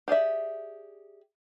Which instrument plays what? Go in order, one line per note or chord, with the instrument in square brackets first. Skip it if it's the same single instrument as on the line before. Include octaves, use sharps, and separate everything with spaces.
[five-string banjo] G4 G#4 D5 E5